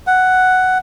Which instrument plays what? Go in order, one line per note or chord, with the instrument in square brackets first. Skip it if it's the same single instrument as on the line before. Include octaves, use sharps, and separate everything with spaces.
[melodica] F#5